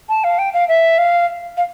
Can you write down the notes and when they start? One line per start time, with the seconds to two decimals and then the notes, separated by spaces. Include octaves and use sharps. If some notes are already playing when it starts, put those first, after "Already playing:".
0.09 A5
0.24 F5
0.39 G5
0.53 F5
0.68 E5
0.98 F5
1.57 F5